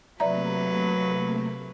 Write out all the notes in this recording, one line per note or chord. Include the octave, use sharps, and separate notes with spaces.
C3 F#3 A3 A#3 B4 D5 E5 A#5